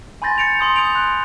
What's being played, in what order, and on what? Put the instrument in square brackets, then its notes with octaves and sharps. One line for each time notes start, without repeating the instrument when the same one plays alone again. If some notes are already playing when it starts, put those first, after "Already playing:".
[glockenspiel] G#5 B5 C6 G6 A6 A#6
G6 A6 C#7 D7 F7
C6 D#6 G6
D#6 G6 A6 D7 F7
C6 F#6